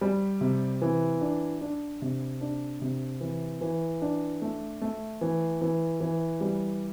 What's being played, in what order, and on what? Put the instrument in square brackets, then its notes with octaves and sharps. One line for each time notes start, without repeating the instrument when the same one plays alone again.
[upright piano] G3
C3
E3
D4
D4
C3
D4
C3
E3
E3
D4
A3
A3
E3
E3
E3
G3